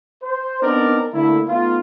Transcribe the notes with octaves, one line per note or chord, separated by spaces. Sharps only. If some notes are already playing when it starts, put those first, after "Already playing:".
C5
B3 C4 D4 D#4 A#4 D5
D3 A3 A#3 E4
A3 B3 D#4 F4